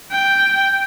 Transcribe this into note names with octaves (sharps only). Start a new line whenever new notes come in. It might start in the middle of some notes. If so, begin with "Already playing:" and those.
G5